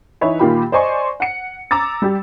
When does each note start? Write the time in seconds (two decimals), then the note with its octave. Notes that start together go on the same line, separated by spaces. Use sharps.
0.21 E3 D#4 B4 C#5 E5
0.39 A#2 D#3 F4 G4 B5
0.72 C5 D5 D#5 G#5 C6 C#6
1.20 F#5 C#7
1.71 A#5 D6 E6 A6
2.02 G3 G4